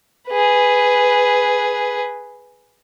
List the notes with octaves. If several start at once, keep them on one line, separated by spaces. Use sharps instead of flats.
G#4 B4